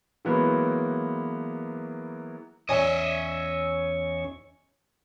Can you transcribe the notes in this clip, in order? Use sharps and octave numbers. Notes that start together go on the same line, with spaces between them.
E3 F#3 G#3 A#3 B3 E4
E2 C#4 C#5 D#5 E5 G#5 C#6